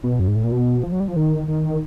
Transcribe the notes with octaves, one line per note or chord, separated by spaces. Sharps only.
B2
F#2
G#2
A2
A#2
B2
F3
F#3
G3
F3
D#3
D#3